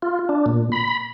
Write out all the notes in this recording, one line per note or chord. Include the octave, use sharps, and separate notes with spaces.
F4
D4
A#2
B5